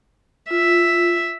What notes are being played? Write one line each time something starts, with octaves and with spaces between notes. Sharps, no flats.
F4 E5